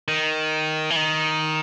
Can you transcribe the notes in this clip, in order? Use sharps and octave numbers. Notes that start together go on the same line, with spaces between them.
D#3
E3
D#3